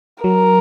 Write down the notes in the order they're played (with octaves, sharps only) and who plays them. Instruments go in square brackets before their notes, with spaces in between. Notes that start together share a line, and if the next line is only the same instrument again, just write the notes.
[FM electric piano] F#3 [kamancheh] A#4